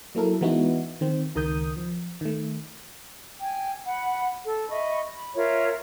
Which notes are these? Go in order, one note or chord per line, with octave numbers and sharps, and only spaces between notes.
F#3 A#3 E4 A4 A#4
E3 G#3 B3 D#4 E4 F#4
D#3 C4
C#2 D#3 A#4 D#6 G6
F3
D#3 A3
G5 G#5
F#5 B5
A4
D#5 E5 B5 C#6
B5
F4 A#4 C#5 E5